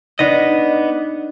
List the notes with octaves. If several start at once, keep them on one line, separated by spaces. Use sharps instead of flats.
B3 D4 D#4 D#5